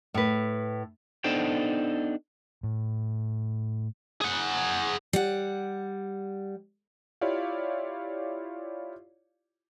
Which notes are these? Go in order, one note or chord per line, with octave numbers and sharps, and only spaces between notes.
A2 B4
B3 D4 D#4 A4 C5 G5
A2
G#4 F#5
G3 F#5
E4 F4 G4 C#5 D5 F5